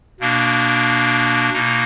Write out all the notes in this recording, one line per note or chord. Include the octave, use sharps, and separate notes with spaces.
B2 A#3 D4
B2 A#3 D#4